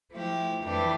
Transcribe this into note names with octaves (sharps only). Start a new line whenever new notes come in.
F3 A3 E4 G4
F2 E3 A3 D4 G4